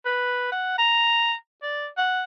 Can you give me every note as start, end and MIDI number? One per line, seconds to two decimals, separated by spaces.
0.05 0.49 71
0.52 0.74 78
0.78 1.34 82
1.62 1.87 74
1.98 2.24 78